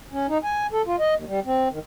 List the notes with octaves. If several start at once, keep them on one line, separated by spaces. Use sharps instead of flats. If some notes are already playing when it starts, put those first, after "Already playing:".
C#4
D#4
G#5
A4
F4
D#5
D#2
G3
C4
D#3